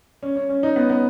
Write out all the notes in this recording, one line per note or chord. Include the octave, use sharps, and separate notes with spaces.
C#4
C#4
C#4
D#4
B3
B3